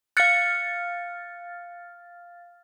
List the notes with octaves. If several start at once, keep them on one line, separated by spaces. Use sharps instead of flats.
F5 F6 F#6 A6 C#7